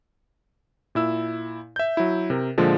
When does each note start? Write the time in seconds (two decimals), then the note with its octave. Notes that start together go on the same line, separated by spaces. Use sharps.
0.95 A#2 E4 E6
1.76 E5 G6
1.97 F#3 E4
2.30 C3 A#4
2.58 A#2 D3 F3 G#3